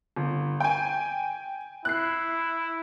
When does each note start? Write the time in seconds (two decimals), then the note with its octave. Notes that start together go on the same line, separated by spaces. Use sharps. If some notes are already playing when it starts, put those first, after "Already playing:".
0.16 G1
0.60 G5 G#5
1.85 E4 F#6 C7